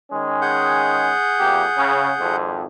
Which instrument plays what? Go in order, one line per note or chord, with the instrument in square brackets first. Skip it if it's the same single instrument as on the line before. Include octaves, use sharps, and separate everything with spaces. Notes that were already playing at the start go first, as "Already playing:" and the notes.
[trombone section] D#3 G#3 C#4
[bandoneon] G#4 F#5 G6
[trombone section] F2 A#3 G4
C#3
G#1 F2